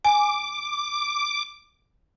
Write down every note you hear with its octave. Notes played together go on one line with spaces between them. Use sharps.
G#5 D6